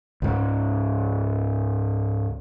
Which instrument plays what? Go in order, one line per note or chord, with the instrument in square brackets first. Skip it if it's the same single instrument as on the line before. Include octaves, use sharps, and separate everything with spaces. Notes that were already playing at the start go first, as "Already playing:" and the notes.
[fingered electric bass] C#2 G#2 C#3